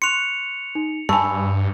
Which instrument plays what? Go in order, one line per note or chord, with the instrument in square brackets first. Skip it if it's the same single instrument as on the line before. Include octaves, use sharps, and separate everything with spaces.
[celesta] C6 C#6 F#6 [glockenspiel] C#7 F7
[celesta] D#4
[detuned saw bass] G2 [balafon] G#5 A5 [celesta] B5 C#6 E6